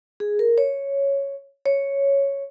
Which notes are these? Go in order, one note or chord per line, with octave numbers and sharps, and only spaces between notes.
G#4
A#4
C#5
C#5